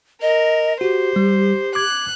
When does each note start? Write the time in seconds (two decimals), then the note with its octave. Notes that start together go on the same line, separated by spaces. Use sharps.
0.22 A#4 D#5
0.81 F#4 G4 C5
1.16 G3
1.75 D6 F#6 G#6